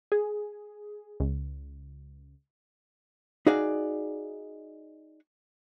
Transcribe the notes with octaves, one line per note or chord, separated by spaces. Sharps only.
G#4
C#2
D#4 F#4 G#4 D5 F5